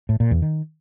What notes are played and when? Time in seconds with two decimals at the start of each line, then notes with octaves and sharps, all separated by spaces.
0.09 A2
0.20 A#2
0.31 E2
0.42 D#3